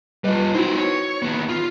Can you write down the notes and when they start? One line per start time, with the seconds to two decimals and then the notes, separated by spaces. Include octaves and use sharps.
0.24 G3 F4 B4 D#5
0.54 B3 D#4 E4 F#4 C5
0.78 C#5
1.22 D#2 B3
1.49 F4